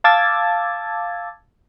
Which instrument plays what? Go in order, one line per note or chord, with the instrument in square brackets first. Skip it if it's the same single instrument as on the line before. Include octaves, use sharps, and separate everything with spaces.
[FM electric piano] F5 A5 D6 E6 G#6 A6